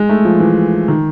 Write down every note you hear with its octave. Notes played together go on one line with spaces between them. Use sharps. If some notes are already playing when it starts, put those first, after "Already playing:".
Already playing: G#3
A3
F3
E3
D#3